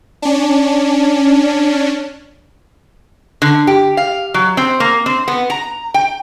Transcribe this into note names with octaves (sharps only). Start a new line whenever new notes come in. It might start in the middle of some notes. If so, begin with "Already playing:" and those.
C#4 D4
D3
G4
F5
F#3
C4
A#3
C4
B3
A#5
G5